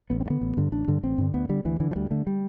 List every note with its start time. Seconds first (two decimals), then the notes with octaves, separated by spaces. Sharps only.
0.10 A1 B3
0.20 C4
0.26 G2
0.30 D3 B3
0.41 A1
0.57 G2 D3
0.72 A1 D4
0.88 G2 D3
1.03 A1 C4
1.18 G2 D3
1.34 D2 B3
1.49 D3 G3
1.65 D2 E3
1.80 D3 E3
1.91 F3
1.96 D2 G3
2.11 D3 A3
2.27 G3